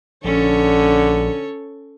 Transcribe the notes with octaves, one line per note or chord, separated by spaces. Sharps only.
A#1 D3 C#4 A4 C#5